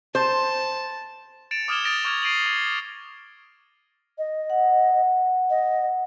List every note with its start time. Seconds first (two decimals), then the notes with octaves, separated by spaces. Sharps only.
0.15 C5 A5
1.51 A6 C#7 D7 E7 F7
1.68 D6 D#6 F6 G#6 E7 G7
1.85 D#6 A6 A#6 D7 F7
2.05 C#6 D6 F6 G#6 E7 F7
2.23 A#6 C7 D7 D#7 F7 F#7
2.46 D#6
4.18 D#5
4.50 F#5
5.50 D#5